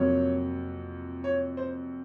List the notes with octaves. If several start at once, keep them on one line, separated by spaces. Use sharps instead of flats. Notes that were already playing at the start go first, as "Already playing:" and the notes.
Already playing: F2 C3 F#3 A#3 C#5
C#5
C5